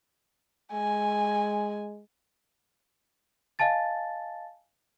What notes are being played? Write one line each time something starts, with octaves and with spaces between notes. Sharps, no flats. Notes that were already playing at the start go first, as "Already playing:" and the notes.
G#3 G#5
D#5 F5 G#5 A5 A6